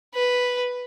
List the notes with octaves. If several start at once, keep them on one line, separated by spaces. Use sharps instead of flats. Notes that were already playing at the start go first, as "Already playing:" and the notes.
B4